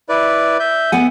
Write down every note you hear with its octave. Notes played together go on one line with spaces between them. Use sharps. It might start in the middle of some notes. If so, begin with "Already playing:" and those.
E4 B4 D5
E5 G6
B3 F#5 G#5